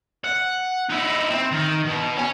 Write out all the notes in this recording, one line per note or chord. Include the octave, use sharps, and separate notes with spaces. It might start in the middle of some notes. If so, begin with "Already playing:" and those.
F#5
D#4 E4
C4
D#3
B2
C#5 G#5